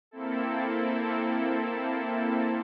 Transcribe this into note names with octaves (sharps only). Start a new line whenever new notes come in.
A#3 C4 E4 A4